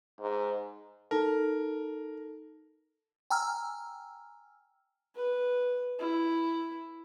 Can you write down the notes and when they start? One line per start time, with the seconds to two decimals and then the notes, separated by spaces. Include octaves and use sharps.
0.20 G#2
1.11 D#4 A4 A#4 A5
3.30 G5 G#5 A#5 E6 F6
5.16 B4
5.99 E4